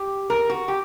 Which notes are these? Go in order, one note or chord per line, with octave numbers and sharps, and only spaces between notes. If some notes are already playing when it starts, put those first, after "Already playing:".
Already playing: G4
A#4
F#4
G4